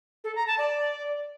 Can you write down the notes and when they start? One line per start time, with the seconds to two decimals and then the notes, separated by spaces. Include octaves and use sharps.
0.24 A4
0.36 A#5
0.47 A5
0.58 D5